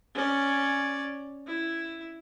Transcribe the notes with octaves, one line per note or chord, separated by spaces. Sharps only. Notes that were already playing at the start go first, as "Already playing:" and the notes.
C#4 D5
E4